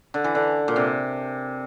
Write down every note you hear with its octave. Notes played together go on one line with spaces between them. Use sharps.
D3
E3
D3
A#2
C3